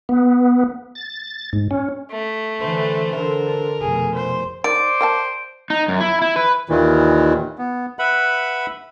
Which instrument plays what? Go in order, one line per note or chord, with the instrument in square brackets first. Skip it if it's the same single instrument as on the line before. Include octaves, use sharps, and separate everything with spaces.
[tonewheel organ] B3
A6
G#2
C#4
[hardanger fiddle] A3
[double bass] D3 E3 [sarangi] C5
[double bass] D3 [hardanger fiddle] A#4
[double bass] F1 B2 [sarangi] G#4
[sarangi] C5
[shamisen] D#3 [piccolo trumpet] C5 [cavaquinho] D5 [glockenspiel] D7
[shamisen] A#4 G5 A5
[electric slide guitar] D#4
F#2
E4
E4
B4
[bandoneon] D#2 A#2 D#3 E3
B3
B4 E5 F#5 B5